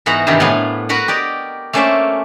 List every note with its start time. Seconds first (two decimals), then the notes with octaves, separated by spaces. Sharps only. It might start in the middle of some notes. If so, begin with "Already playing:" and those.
0.06 G#2 E3 B3 F#4 F#5 A#5
0.27 G2 C3 D#3 E3 G3
0.40 A2 B3 D4 F5 G#5
0.89 F#4 A#4 B4 F#5
1.08 G4 A#4 D5 D#5
1.73 A3 A#3 C#4 C5 D5 E5